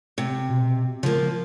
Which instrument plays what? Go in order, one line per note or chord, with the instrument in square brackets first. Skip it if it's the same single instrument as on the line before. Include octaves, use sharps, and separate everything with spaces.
[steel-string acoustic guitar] C3
[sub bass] B2
[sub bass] C#3 [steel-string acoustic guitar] F3 A#3